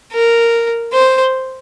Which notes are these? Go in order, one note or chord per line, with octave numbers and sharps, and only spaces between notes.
A#4
C5